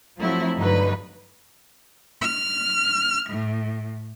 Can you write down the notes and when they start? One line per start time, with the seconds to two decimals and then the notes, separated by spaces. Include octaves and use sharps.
0.18 F3 F#3 A3 C4 E4
0.55 G2 D3 F#3 D#4 B4
2.21 F6
3.28 A2